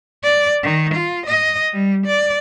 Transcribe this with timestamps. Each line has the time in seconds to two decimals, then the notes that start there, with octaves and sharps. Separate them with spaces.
0.23 D5
0.63 D#3
0.94 F4
1.26 D#5
1.73 G3
2.06 D5